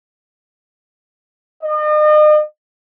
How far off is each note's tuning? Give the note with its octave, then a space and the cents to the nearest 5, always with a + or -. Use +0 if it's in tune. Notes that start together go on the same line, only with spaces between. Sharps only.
D#5 -40